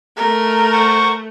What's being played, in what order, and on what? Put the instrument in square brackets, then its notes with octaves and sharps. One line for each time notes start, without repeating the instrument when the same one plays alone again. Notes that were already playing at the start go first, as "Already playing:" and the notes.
[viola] A3 [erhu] A#4
[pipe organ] C5 F#5 C#6